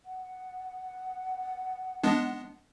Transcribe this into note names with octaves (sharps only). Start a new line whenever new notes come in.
F#5
G#3 B3 D4